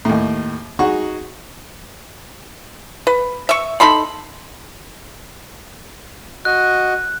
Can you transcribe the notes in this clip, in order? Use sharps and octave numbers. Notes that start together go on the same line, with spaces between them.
D#2 A2
D#4 F#4 G#4 F#5 C#6
B4
E5 C#6
D#4 A4 B5 C6
F#4 D#5 F#6